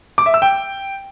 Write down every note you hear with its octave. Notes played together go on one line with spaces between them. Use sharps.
D6
E5
E6
G5